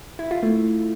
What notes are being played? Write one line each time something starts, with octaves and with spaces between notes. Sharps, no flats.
E4
F4
A3